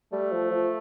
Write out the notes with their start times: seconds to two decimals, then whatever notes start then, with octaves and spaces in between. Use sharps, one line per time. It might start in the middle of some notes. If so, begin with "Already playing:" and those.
0.12 G3 A3
0.32 F3
0.51 F3